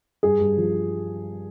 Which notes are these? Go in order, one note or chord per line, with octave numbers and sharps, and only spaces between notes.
G2 G#4
G2
F3